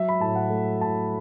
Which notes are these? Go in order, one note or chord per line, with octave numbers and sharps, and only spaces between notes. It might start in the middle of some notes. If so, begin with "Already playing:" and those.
Already playing: F#3 E5
B5
A2 A5
F#5
A3
A2 A5